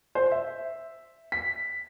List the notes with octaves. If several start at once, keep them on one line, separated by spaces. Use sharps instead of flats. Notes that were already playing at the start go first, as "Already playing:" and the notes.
C5
E5
B6